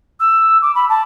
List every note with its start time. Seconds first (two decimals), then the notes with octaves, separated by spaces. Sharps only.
0.20 E6
0.62 D6
0.75 B5
0.89 A5